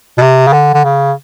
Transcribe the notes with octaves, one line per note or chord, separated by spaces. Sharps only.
B2
C3
C#3
D3
D3
C#3